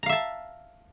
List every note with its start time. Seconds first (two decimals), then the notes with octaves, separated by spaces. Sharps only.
0.03 A#5
0.06 F5
0.09 E5
0.13 A5